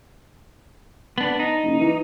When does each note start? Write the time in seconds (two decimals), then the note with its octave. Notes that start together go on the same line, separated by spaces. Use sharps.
1.18 B3 D4
1.39 D#4
1.63 F#1
1.80 E3